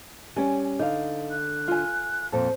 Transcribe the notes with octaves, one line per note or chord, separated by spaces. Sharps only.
G3 C#4 G#5
D3 D#4 F5
F#6
F4 G#5
F2 A#2 A4 C5